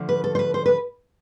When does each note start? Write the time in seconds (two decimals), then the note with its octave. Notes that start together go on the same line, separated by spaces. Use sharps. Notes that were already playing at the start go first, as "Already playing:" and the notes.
Already playing: D3 F3 A3
0.09 B4
0.24 A4
0.35 C5
0.39 B4
0.54 C5
0.66 B4